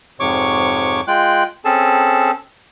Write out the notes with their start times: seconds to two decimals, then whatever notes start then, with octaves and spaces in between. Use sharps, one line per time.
0.20 F2 G#2 C3 C#5 C#6 D6
1.08 G#3 F4 G5 F#6
1.65 C4 C#4 G#4 A4 A5